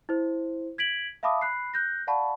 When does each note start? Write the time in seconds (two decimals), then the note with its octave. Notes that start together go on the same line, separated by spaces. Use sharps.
0.09 E4 C5
0.78 G#6 B6 D7 F#7
1.23 E5 F5 A5 B5 D6 D#6
1.41 B5 F#6 C7
1.74 F#6 G6 A#6
2.07 D5 F5 F#5 A5 B5 C#6